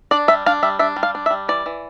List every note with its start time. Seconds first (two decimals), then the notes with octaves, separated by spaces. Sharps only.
0.11 D4 D5
0.28 G3 E5
0.46 D4 F5
0.63 G3 E5
0.79 D4 E5
0.96 G3
1.03 F5
1.15 D4
1.26 E5
1.31 G3
1.49 E3 D5
1.66 E3